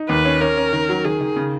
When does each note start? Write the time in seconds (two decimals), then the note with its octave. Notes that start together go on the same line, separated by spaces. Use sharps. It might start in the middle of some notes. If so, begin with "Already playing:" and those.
Already playing: D#4
0.09 D#2 B4
0.25 C#4
0.41 C#4 A#4
0.57 C#4
0.73 D#3
0.89 F#3
1.04 D#3 G#4
1.21 D#3
1.36 C#3